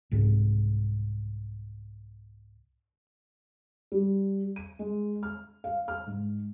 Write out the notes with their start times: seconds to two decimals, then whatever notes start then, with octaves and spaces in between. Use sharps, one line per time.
0.11 C2 G#2
3.92 G3
4.56 D#7
4.79 G#3
5.23 F6
5.64 F5
5.88 F6
6.06 G#2